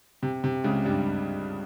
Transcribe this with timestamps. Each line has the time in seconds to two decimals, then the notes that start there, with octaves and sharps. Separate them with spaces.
0.22 C3
0.44 C3
0.64 C#2 C#3
0.85 G2 G3